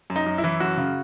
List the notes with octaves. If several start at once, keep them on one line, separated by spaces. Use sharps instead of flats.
F#2
D#4
F#2
E4
E3
F#2 F#4
C#3